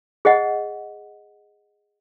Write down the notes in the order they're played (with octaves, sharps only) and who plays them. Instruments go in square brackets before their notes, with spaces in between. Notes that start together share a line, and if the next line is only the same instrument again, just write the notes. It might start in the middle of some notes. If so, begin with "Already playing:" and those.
[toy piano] G#4 C5 D#5 F#5